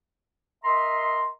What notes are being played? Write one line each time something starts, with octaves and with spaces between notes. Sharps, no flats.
A#4 D#5 E5 A#5 C6